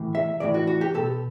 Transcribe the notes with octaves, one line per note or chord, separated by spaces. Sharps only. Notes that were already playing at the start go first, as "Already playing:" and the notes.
Already playing: A2 E3
E5
A2 E3 D5
F#4
F#4
G4
B2 A4